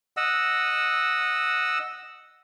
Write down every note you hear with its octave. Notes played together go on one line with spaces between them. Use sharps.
D#5 F#5 E6